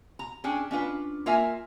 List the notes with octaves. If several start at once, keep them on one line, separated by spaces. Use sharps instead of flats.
A#5
C#4 D4 G#4 G5
C#4 D4 F4 B4
A#3 F4 A#4 E5 G#5